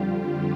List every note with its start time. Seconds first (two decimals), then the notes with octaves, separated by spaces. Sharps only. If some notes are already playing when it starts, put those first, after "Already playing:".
Already playing: F2 D3 G3 F4 G4